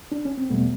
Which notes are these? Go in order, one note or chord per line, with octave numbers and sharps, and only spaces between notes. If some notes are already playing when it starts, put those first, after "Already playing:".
D4
C#4
C4
E2 B2 G3 A3 B3